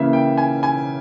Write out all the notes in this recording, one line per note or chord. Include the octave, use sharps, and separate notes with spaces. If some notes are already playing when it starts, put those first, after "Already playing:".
Already playing: C#3 E3 A#3 E5
G5
G#5
G#5